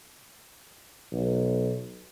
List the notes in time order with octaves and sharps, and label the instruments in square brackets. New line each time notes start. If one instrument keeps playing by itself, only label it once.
[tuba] B1